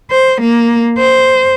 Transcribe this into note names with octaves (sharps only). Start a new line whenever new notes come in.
C5
A#3
C5